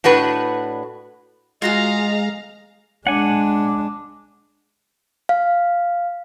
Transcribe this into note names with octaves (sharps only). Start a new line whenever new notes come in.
A2 D4 F#4 B4
G#3 F4 F#4 G#4 D#5 F5 A#5
G#3 D4 F#5 G#5
F5